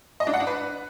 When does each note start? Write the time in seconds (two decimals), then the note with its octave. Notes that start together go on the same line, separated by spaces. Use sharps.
0.20 D#5
0.27 D4
0.34 F#5
0.40 D4
0.47 B4